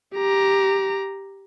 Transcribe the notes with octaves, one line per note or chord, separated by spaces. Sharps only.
G4 A#5